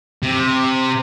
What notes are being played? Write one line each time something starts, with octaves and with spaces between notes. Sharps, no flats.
C3